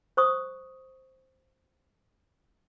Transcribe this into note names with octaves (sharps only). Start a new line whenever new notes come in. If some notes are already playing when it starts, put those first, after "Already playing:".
C5 C#6 D#6